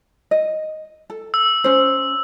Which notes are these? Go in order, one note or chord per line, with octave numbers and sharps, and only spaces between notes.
D#5
A4
E6
C#4 C5